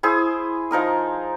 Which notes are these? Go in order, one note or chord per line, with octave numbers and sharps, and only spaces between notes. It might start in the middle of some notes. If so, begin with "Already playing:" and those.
E4 G#4 C5 D#6
F3 D#4 A#4 D#6